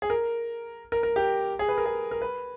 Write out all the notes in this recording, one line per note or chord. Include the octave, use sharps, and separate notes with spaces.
G#4
A#4
A#4
A#4
G4
G#4
B4
A#4
G#4
A#4
B4